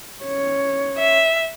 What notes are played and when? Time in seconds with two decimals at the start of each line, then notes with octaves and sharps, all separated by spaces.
0.24 C#4 C#5
0.98 E5